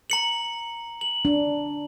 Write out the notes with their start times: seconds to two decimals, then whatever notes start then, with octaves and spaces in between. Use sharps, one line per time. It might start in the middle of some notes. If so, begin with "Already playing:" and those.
0.10 A#5 C#7 F#7
1.01 F#7
1.25 D4